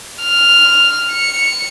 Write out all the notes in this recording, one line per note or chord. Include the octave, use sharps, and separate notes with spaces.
F6
C#7